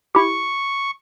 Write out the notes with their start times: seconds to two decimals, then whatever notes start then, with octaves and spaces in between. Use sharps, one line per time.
0.15 E4 G4 C#6